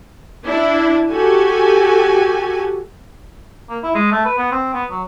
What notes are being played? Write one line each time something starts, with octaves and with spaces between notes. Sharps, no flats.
D4 E4
F#4 G4 A4 G#5
A#3
E4
G#3
A3
B4
B3
C4
B3
F#3